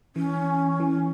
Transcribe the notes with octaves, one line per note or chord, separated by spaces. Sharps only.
E3 C#4
E3